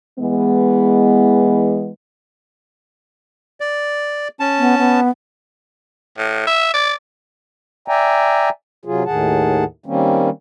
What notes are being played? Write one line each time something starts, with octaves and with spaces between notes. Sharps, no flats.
E3 G#3 B3
D5
C#4 A5
B3
B3
A2
E5
D5
D5 E5 G5 G#5 A#5
C3 F#3 F4 G#4
D#2 A2 D#3 G#4 F#5 A5
D#3 G3 A#3 C4 C#4